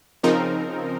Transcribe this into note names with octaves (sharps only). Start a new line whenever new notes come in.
C#3 F3 C4 D#4 A#4